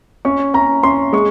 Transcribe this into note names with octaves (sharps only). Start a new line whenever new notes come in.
C#4 C#6
C#4 A#5
C#4 C6
G#3 C#6